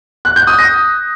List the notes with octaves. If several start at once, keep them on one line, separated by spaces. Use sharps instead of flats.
F#6
G6
D#6
A#6